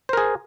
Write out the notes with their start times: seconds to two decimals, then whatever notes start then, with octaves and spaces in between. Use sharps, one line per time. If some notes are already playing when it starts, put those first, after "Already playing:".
0.09 C5
0.13 A#4
0.17 G#4